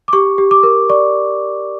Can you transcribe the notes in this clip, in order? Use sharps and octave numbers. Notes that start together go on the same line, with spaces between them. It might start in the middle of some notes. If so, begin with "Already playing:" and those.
D6
G4 C#6
G4
D6
A#4
D5 C#6